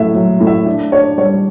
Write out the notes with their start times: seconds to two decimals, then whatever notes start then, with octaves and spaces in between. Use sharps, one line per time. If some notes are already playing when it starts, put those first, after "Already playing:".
Already playing: A2 F#3 E5
0.14 F#3
0.40 A2
0.47 E5
0.66 D4
0.92 D4 C#5
1.18 G3 C#5